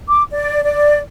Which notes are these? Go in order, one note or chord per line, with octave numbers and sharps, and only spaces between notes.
D6
D5
D5